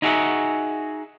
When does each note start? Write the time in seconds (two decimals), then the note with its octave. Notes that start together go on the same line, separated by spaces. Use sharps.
0.02 D#4 E4 F#4 G#4 E5 F#5